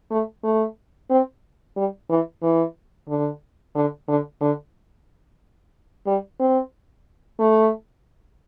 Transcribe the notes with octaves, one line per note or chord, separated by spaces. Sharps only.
A3
A3
C4
G3
E3
E3
D3
D3
D3
D3
G3
C4
A3